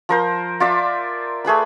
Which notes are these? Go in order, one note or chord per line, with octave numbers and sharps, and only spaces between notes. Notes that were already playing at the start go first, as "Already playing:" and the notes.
F3 A#4 C5
F4 D5 E5
A3 G#4 B4 B5